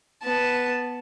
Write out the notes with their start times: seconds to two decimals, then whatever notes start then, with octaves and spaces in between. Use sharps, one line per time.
0.23 B3 A5